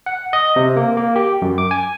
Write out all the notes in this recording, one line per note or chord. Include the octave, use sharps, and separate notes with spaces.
F#5
D#5
C3
A#3
A#3
G4
F#2
D6
G#5